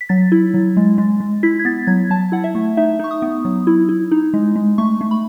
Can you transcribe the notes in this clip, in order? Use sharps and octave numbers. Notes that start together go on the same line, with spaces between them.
B6
F#3 A6
E4
F#3
G#3
G#3
G#3
E4 B6
G#6
B3 A6
F#3 G#6
F#3 A5
E4 F#5
E5
A3
D#4 E5
D#4 C#6
D#6
B3
F#3
E4
E4
D#4
G#3
G#3
A3 C#6
A3
B5